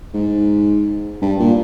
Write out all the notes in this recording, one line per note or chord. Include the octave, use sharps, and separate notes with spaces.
G#2
G2
A#2